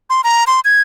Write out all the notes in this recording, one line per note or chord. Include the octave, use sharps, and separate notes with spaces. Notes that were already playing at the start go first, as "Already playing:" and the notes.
C6
A#5
C6
G#6